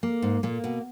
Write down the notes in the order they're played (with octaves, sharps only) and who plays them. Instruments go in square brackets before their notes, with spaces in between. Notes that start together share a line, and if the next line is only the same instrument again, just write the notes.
[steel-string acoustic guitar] A#3
[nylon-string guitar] G#2
[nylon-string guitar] A#2 [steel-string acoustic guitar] A#3
[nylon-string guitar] B2